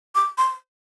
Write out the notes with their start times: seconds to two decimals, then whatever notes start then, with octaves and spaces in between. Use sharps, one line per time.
0.15 D6
0.38 C6